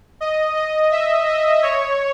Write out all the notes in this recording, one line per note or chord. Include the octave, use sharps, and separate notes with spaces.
D#5
D#5
E5
D#5
C#5